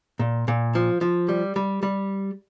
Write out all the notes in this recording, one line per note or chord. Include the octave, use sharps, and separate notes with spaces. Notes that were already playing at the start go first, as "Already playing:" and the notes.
A#2
A#2
F3
F3
G3
G3
G3